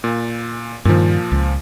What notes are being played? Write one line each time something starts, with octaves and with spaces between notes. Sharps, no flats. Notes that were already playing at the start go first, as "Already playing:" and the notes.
A#2
G2 A#2 D#3 F3
C#2